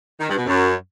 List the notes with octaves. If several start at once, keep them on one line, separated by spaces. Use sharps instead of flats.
D#3
G2
B2
F#2